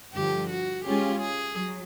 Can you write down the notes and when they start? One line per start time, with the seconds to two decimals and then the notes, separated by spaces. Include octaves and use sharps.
0.13 G2 D3 F3 G4
0.50 F#4
0.84 G#3 C#4 F4 G4 G#4
1.21 G#4
1.55 F#3